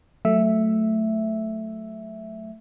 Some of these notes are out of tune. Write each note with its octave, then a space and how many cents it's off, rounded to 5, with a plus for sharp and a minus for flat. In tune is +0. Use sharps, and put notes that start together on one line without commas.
F#3 +0 A3 +0 E5 +0